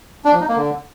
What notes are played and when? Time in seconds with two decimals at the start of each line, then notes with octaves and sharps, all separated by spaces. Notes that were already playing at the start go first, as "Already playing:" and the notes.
0.25 D4
0.33 F3
0.41 D#4
0.48 A#3
0.56 D3